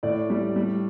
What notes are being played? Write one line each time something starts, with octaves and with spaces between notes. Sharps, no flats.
A2 D5
G3
G3